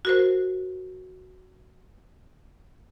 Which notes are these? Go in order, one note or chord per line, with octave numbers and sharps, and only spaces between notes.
F#4 A#4 C5